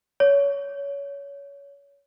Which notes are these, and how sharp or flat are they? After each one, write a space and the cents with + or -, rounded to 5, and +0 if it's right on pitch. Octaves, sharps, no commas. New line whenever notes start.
C#5 +25